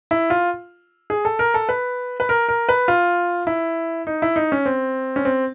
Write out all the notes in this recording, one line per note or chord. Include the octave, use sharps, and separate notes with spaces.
E4
F4
G#4
A4
A#4
A4
B4
B4
A#4
A#4
B4
F4
E4
D#4
E4
D#4
C#4
C4
C#4
C4